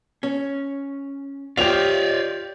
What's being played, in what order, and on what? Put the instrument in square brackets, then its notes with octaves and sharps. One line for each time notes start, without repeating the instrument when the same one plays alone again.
[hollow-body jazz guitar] C#4
[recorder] F4 [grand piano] G4 F7 [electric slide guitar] C#5 D5 [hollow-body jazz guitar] E5 F5